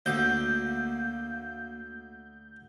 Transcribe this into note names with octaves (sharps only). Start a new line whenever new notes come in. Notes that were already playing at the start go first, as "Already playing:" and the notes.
D2 A#3 G6